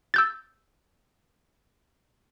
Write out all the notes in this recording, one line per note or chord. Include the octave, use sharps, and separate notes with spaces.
E6 G6 A6